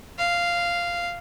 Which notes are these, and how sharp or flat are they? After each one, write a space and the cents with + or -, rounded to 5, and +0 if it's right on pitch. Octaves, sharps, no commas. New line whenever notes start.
F5 -5